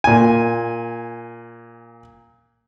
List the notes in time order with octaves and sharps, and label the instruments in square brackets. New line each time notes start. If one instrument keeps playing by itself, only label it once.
[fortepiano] A#2 G#5